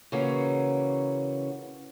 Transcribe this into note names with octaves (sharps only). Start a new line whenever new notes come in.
C#3 E3 A#3 C#4 F#4